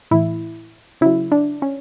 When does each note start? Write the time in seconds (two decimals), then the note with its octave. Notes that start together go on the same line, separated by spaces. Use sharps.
0.11 A2 E3 E4
1.01 C#3 F#3 E4
1.32 D4
1.62 C#4